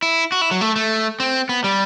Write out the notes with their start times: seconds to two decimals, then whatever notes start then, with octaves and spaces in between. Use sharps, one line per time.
0.02 E4
0.32 F#4
0.41 E4
0.51 F#3
0.61 A3
0.76 A3
1.20 C4
1.49 B3
1.64 G3